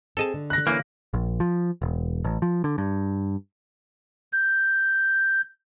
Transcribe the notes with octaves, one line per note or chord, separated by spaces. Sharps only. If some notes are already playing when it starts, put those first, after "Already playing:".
C4 G#4 A4 D#5 A5
D3
F#6 A#6
E3 A#3 C#4
A#1
F3
E1
A1
F3
D3
G2
G6